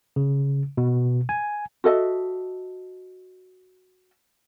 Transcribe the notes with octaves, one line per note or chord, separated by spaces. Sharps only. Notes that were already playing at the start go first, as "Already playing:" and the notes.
C#3
B2
G#5
F#4 A4 D#5 E5